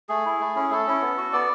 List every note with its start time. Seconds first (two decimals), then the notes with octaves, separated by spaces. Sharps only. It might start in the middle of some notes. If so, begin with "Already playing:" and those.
0.09 A3 G#4
0.26 E4
0.40 A3
0.56 C#4 E4
0.71 A3 A4
0.87 C#4 E4
1.02 B3
1.18 F#4
1.33 B3 D5